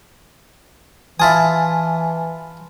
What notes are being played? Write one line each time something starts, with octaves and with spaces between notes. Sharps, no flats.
E3 E4 F4 G#5 A5 D#6